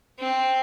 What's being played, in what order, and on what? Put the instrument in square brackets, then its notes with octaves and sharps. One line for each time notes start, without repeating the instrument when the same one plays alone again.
[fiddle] C4